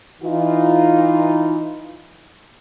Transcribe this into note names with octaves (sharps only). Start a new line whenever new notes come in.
E3 D#4 F4